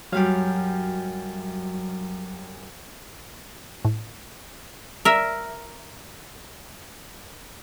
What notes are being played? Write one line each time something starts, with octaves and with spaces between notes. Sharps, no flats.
F#2 F#3 G3 F5 G5
A2
A#4 E5